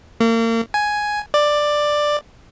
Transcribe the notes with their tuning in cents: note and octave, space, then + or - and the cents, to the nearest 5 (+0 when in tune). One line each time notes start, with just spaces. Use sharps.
A#3 -35
G#5 +5
D5 +10